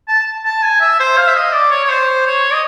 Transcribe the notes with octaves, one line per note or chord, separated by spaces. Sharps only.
A5
A5
G#5
E5
C5
F5
E5
D#5
D5
C#5
C#5
C5
C#5
D#5